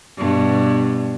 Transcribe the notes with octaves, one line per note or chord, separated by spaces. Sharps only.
G2 B2